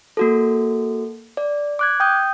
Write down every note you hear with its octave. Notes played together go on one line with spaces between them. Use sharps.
A#3 F#4 A4
D5
D6 F#6 G#6
G5 D#6 G6